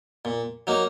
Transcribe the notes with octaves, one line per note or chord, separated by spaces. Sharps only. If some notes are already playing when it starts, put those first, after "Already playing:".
A#2
F#3 A#3 D#4